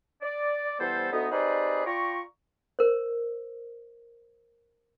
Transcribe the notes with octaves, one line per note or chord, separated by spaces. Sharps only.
D5
E3 G3 B3 A4 C5
D2 B3 D#4
C4 D#4 G4 G#4 B4 D5
F4 D5 G5 A#5 C#6
A#4 C5